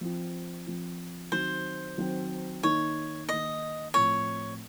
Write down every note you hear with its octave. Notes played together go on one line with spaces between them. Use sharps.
F3 C4 F4
F3 C4 F4
D#3 F#3 C4 F#4 C5
D#3 F#3 C4 F#4
D#3 A#3 D#4 C#5
D#3 A#3 D#4 D#5
A2 F3 C4 F4 C#5